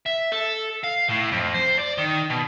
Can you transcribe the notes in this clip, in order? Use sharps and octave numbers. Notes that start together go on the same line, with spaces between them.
E5
A4
F5
A2
F2
C5
D5
D#3
B2